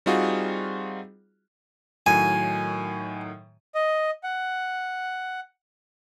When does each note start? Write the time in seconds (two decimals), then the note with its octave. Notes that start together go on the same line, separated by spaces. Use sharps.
0.06 G3 C4 D#4 F4 F#4 G#4
2.06 A2 D#3 F#3 G#5
3.75 D#5
4.23 F#5